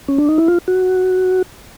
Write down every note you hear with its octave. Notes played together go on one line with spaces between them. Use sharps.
C#4
D4
D#4
E4
F4
F#4